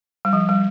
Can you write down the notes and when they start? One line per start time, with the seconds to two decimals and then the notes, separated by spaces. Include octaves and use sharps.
0.25 G3
0.33 F3
0.49 G3